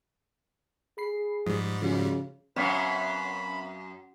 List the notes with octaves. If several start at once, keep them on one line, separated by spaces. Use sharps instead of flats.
G#4 B5 C7
G#2 F3 G3 D#6
C#3 F3 F#4 G#4
F#2 C4 B4 C#5 F5 B5